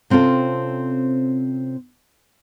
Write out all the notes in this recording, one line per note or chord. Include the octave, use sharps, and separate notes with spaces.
C3 C4 C#4 F4 A4